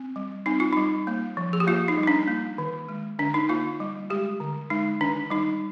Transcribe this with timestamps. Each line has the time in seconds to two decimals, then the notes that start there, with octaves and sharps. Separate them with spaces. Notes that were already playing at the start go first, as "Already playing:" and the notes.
Already playing: C4
0.16 G3
0.46 C4 D#4
0.60 F4
0.73 G3 D#4
1.07 A#3
1.37 F3
1.53 G#4
1.60 G4
1.67 A#3 F4
1.88 D#4
1.98 G3
2.03 D#4
2.07 D4
2.28 A#3
2.58 D#3
2.89 G#3
3.19 D3 D4
3.34 D#4
3.49 A#3 F4
3.80 G3
4.10 G#3 G4
4.40 D3
4.70 G#3 D#4
5.01 D#3 D4
5.30 G3 D#4